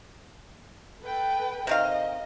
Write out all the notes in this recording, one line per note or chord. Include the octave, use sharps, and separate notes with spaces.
A4 B4 G5
C3 D#3 D#5 F5